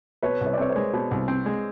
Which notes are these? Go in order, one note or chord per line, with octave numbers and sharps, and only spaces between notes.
B2 B4 C#5
C2
C#5
D5
C4 B4 C#5
A#4 C5
G#3
B2
C2
C4
G#3